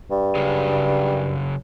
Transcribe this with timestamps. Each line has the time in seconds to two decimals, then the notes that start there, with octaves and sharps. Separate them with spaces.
0.11 G2
0.35 C#3 F#3 G#4